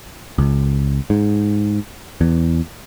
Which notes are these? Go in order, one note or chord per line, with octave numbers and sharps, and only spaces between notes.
C#2
G#2
E2